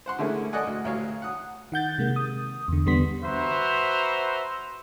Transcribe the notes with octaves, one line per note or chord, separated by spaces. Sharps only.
C5 F#5 C6
D3 G#3 A3 C#4 E4 A#4
A4 D5 D#5 F#5 G#5
D2
A1 D2 C#5 F5
F#5 D#6
D#3 F#5 G6 A6
C3 G#3 A#3
D#6
E2 D3
E2 D3 G3 B3 C6 B6
F#4 B4 C5 E5 A#5